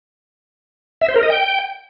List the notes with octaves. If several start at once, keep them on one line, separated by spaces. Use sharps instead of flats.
E5
C5
A#4
D#5
G5